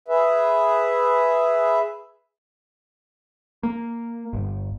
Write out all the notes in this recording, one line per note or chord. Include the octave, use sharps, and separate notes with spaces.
G#4 B4 E5
A#3
G1